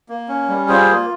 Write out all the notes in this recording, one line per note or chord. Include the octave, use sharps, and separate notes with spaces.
A#3
C#4
G3
F4 G#4 C5
A#3